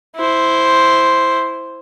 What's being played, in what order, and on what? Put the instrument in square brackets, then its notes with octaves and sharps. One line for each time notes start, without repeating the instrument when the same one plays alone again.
[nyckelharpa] E4 C5